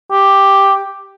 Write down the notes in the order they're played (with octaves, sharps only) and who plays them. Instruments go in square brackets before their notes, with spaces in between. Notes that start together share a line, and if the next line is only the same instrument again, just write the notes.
[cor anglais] G4